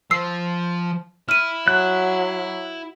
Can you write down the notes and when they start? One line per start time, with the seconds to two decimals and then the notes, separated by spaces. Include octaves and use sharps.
0.11 F3 E6 C7
1.29 E4 F6 D#7
1.68 F#3 F#6